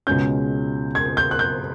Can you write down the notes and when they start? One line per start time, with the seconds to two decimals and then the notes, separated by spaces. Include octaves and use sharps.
0.07 C#2 B2 G#3 C#4 G6
0.95 G#6
1.17 G6
1.31 F#6
1.39 G6